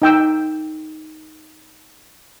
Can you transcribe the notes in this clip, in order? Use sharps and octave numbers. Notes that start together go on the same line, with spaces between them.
D#4 G5 E6